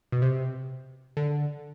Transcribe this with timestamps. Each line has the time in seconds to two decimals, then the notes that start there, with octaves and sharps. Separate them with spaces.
0.12 B2
0.22 C3
1.17 D3